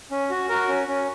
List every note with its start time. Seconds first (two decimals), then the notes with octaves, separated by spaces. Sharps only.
0.11 C#4
0.30 F#4
0.49 F#4 A#4
0.69 C#4
0.87 C#4